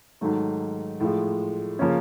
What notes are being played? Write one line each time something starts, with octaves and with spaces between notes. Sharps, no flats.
G#2 D#3 F#3 A3
A2 F3 G#3
C#3 F3 A#3 C#4